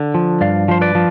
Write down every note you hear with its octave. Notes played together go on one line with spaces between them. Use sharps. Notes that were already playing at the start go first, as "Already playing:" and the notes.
Already playing: D3
F3
G2 D5 F5
F3 C5
B4 D5
F3